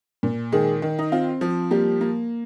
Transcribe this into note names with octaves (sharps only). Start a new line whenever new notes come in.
A#2
D#3 G#3 G#4
D#3
D#4
C4 F4
F3
G3 A#3 G4
A#3